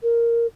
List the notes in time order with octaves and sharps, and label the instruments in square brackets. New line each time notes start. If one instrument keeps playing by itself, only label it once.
[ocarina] A#4